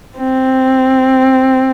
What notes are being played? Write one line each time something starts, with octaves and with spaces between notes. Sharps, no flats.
C4